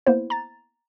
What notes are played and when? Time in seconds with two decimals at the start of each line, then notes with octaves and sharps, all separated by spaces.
0.07 A#3 B3 E4 C5
0.30 A#5 A6